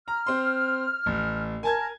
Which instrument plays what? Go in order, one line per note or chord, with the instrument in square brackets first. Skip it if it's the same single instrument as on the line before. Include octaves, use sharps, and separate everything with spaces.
[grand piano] A#5 [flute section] F6
[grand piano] C4 C6
A1
[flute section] A#4 [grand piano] G#5 A5 G#6